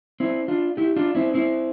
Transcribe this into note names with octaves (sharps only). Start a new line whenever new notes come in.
C4 E4
D4 F4
E4 G4
D4 F4
C4 E4
C4 E4